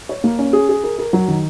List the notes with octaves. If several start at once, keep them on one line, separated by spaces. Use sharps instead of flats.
C#5
A#3
C#4
G#4
G#4
A#4
A#4
F#3
D#3